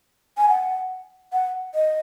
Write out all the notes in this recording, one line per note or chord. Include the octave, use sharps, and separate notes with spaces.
G#5
F#5
F#5
D#5